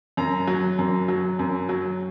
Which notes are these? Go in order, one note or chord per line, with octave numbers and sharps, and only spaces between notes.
F#2 A#5
F#3
F#2
F#3
F#2
F#3